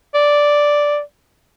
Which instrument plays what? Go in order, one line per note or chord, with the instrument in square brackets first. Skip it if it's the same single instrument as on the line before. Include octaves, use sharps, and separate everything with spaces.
[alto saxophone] D5